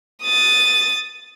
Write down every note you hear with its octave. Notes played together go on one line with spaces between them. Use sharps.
D#6 A6